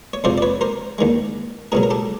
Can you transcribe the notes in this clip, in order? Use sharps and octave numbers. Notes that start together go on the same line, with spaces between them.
C#5
F2 C3 F3 G#3 C5 D5
D5
B4 C#5
A#4 C5
D#2 D#3 G#3
C#2 B2 F#3 G#4 A#4
A#4
G4 A4